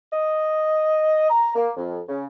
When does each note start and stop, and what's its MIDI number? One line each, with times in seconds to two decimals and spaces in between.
0.13 1.29 75
1.30 1.55 82
1.55 1.71 58
1.77 2.00 41
2.09 2.26 49